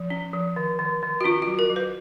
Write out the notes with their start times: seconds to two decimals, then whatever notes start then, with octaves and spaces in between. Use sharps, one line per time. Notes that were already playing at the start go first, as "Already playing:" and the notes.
Already playing: F3
0.10 C#4
0.33 F3
0.56 D#3
0.79 D#3
1.03 D#3
1.21 F#4
1.24 C#4 F4
1.42 F#4
1.47 F#3
1.59 A#4
1.70 F#3
1.76 B4